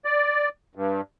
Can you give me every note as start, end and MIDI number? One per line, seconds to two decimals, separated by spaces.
0.05 0.49 74
0.75 1.01 43